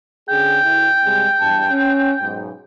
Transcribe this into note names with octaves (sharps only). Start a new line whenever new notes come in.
D3 C#4 G#4 G5
D2 E4
C3 G3 G#3
E2 G2 A5
C#4
B1 G#2